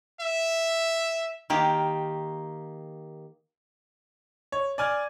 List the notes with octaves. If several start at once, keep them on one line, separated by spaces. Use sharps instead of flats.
E5
D#3 A#3 G4
C#5
D5 G#5 F6 G#6